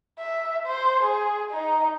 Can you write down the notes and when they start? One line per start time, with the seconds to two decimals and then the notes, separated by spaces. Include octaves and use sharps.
0.19 E5
0.66 C5
1.03 G#4
1.51 D#4